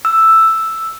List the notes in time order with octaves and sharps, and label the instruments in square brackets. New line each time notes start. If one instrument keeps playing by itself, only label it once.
[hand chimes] E6